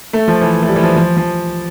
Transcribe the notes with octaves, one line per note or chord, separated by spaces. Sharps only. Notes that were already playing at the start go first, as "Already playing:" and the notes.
A3
F3
E3
A3
G3
E3
F3
F3
F3